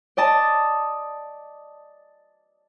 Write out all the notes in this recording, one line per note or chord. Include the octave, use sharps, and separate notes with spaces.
D5 D#5 A5